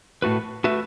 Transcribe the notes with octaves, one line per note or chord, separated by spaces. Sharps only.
A2 A3 F#4 B4
A3 F#4 B4 E5